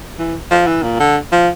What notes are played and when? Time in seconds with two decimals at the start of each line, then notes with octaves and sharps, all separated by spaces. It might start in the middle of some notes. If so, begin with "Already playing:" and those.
0.19 E3
0.51 F3
0.67 E3
0.83 A#2
1.00 D3
1.32 F3